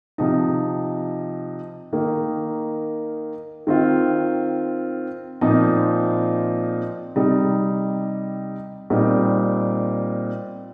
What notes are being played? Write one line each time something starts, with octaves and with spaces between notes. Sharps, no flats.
C3 F3 D#4
D#3 A#3 D#4
D#3 C4 F4
A#2 F3 C4 D#4
C3 G3 D#4
A#2 G3 C4 D#4